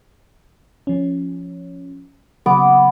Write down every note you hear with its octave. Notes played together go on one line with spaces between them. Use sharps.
F3 C#4
C#3 F#3 A#3 B3 D6